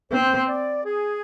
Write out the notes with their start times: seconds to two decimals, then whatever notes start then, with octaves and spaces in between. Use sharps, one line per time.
0.12 C4 C5
0.49 D5
0.85 G#4